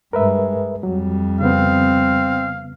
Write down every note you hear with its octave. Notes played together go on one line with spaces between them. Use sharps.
G2 G#3 A#4 B4 E5
F2 F#3 G3
C#3 B3 C4 F5